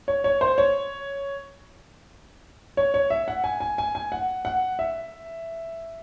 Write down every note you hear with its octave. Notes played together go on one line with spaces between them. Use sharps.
C#5
C#5
C5
C#5
C#5
C#5
E5
F#5
G#5
G#5
G#5
G#5
F#5
F#5
E5